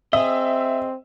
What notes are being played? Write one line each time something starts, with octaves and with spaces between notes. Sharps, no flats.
C4 G#4 D#5 E5